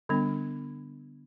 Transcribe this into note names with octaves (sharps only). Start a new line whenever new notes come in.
D3 G3 B3 D4